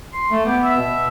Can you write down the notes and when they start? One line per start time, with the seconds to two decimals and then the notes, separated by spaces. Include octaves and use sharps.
0.13 C6
0.31 A3
0.46 B3 G4
0.63 E5
0.77 B2